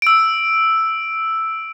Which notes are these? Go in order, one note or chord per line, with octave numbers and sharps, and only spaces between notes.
E6 D7